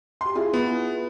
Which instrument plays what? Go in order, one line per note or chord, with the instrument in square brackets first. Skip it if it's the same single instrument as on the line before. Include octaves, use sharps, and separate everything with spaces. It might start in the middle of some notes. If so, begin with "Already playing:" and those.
[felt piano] G4 C6
E4 F4 G#4
[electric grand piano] B3